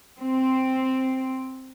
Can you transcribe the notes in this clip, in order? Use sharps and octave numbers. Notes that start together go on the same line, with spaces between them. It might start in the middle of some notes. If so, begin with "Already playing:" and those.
C4